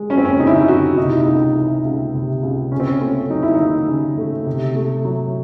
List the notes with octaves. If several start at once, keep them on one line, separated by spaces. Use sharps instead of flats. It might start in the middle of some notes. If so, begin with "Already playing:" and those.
Already playing: G#3
F#2 C#4
C4
C#4
C#3 D#4
E4
D#4
F#2 F#4
C3 D#4
E4
D#4
C#2
E3
C#2
C3
C#2
C#3 C#4
C4
C#4
A3 C#4
F#3 D#4
E4
D#2 D#4
C#3
A3
C3
A3
F#3